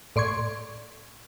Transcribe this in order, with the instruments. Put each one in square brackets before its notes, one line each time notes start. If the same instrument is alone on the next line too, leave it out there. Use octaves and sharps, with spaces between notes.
[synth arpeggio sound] A2 D5 C6 C#6 G#6